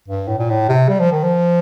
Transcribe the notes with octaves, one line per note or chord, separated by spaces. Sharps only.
G2
A2
A#2
A2
C3
G3
F3
D#3
F3